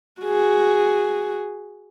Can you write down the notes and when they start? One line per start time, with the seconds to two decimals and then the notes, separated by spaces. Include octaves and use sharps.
0.22 F#4 G#4